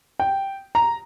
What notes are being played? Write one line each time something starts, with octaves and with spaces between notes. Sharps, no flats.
G5
A#5